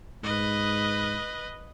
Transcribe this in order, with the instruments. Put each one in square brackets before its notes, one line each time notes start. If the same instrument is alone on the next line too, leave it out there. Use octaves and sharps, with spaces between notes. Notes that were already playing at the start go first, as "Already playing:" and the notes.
[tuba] G#2 [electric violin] B4 D#5